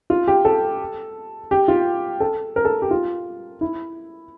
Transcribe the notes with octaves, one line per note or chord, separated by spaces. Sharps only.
F4
G4
A4
G4
F4
A4
A#4
A4
G4
F4
E4